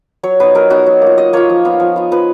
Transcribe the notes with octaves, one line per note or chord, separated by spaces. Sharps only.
F#3 C#5
B3 D#4 B4
F#3 A#4
B3 D#4 F#4
F#3
A#3 F4
F#3 D#5
A#3 F4 C#5
F3
B3 F4
F3
B3 F4
F3 B4